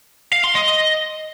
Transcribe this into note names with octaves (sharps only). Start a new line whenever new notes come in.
F5
C6
D#5